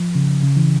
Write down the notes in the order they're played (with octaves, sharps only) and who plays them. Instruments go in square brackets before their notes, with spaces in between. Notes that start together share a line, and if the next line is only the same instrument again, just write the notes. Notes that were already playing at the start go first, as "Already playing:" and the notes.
Already playing: [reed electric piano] F3
C#3
C#3
E3